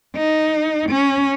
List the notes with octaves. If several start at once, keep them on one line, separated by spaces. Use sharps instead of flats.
D#4
C#4